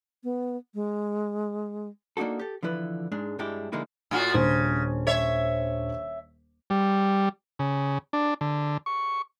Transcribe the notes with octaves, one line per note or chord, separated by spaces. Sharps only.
B3
G#3
A#3 D4 D#4 F#4 A4
G4 A4
D3 E3 F3 E4 B4
G#2 G#3 D4
G2 G3 G#3 D4 E4 G4
D3 F3 G#3 A#3 D#4 E4
A2 F4 F#4
D#1 C#3 D4 C5
C#5 E5
G3
C#3
D4
D3
C#6